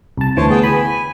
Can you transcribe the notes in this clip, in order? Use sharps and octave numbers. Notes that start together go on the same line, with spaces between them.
C2 A5
D2 E3 C5 C#5 A5
B3 G#4 G5
G#5 B5